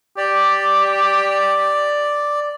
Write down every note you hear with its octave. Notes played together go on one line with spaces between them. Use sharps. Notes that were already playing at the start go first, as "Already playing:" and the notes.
G4 D5